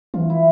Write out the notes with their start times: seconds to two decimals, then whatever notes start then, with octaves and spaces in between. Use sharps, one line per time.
0.14 E3 F4
0.30 E4